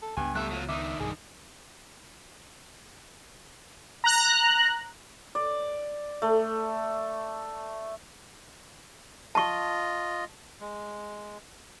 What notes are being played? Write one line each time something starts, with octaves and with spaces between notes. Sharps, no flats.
A4
C#2 G2 B3 G#5
G3 A3 E5 F#6
F#3 F4
D#3 D4 D#4 E5 D6
B1 G2 G#4
A#5 F#6
D5
A3
F4 D#5 A5 C#6
G#3